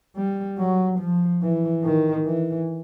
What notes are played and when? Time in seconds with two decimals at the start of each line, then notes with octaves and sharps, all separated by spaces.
0.16 G3
0.58 F#3
0.99 F3
1.42 E3
1.84 D#3
2.25 E3